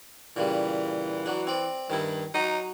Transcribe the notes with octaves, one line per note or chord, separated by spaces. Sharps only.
A#2 C#3 E3 G3
F#3 D4
C4 D5
G2 D#3 E4
F#3 D#4